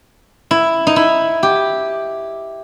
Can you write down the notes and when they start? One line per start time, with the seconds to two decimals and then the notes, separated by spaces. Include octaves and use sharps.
0.51 E4
0.87 D#4
0.96 E4
1.43 G4